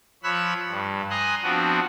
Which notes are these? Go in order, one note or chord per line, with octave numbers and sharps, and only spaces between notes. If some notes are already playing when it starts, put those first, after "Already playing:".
F3 C#5 B5 E6 F#6
G2
G#5 A#5 C6 D#6 F#6
F3 B3 C4 D4 F#4